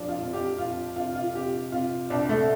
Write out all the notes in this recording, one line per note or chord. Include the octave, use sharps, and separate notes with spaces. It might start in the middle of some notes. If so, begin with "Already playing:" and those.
Already playing: F1 F2 F3 D4
F4
F2
G4
F2 F4
C3 F4
F4
C3 G4
C3 F4
C2 D4
A3